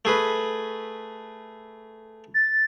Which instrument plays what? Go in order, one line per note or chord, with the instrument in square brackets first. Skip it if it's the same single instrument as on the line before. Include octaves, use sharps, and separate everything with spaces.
[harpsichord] A3 G#4 B4
[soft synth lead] A6